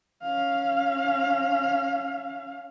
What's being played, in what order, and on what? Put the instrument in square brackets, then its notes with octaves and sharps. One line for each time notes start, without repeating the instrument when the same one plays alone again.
[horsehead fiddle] C#4 F5